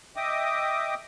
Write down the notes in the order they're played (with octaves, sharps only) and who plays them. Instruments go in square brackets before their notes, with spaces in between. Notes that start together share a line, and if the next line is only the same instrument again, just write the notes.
[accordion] D#5 E5 G5 D6 D#6